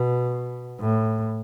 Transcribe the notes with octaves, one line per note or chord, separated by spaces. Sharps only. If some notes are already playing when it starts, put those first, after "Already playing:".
Already playing: B2
A2